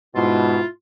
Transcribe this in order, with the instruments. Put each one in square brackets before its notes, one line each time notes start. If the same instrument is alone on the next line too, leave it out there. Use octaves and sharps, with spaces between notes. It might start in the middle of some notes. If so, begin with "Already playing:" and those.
[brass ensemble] G#2 B2 [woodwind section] E4 F4